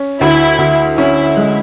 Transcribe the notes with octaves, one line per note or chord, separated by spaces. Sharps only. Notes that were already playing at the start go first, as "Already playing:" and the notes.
Already playing: C#4
D2 E4
D2
C#4 E4
G#3